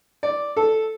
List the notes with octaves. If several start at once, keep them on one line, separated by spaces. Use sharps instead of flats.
D5
A4